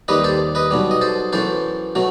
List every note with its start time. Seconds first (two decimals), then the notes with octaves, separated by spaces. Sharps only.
0.08 D#2 D#3 G3 B4 D#5
0.24 A4 C5
0.55 B4 D#5
0.71 B1 B2 G3
0.91 D#5
1.01 A4 C5
1.33 F#2 E3 A3 A4 C5
1.95 B2 F#3 A3